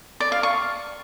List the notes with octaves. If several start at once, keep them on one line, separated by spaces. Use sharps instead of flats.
D5
F5
C#6